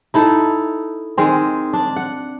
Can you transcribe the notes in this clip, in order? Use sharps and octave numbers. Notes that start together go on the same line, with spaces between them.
D#4 E4 A4
D#3 G#3 C4
D4
F#5